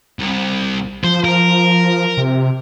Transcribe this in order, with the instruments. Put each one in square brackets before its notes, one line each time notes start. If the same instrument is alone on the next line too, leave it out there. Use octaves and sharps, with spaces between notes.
[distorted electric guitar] C2
[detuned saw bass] F3 [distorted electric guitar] C5
[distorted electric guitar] A#4
[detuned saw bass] C3